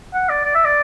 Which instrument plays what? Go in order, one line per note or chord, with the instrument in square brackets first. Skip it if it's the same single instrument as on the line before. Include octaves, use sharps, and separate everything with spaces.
[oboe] F#5
D5
D5
E5
D5